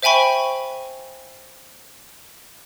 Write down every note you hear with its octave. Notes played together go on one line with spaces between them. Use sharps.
C5 E5 G5 G#5 B5 C#6